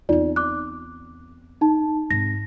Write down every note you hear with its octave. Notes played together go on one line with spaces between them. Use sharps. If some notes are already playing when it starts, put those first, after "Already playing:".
E2 C4 D#4 F4 D5
D6 F#6
D#4 A5
G#2 C4 A#6